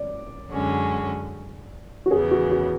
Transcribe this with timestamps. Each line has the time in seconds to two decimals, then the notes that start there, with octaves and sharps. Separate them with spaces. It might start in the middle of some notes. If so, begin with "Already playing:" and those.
Already playing: D5
0.52 F#2 D3 G#3 C#4 F#4
2.06 F#4
2.11 E2 C#3 E3 B3 G#4
2.31 F#4
2.51 F#4